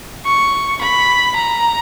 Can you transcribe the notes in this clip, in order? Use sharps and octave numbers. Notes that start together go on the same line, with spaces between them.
C#6
B5
A#5